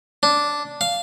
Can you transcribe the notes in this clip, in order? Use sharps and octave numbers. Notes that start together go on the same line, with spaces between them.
D4
F5